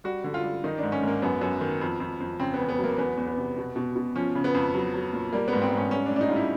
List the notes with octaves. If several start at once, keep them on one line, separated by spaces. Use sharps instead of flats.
G3 F#4
D3
F4
G3
D#3 D#4
D4
G#2
C#4
G#2 A#3
F#2 B3
F#2
D#3
F2
F2
F2
C#3 C4
B3
E2
B3
F#3
A#3
E2 B3
E2
B3
C3
B2
B2
B2
F3 C#4
C#3
B3
F2
F#3
F#3
A#2
G3 A#3
G#2 B3
C4
G#2 C#4
G3 C#4
D4
A2
D4
D#4
G3 F4
E4